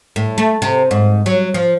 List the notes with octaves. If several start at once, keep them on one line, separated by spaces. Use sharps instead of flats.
A2
A3
C3
G#2
F#3
F3